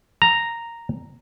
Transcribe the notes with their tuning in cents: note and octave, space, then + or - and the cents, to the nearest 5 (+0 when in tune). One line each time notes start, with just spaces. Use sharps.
A#5 -5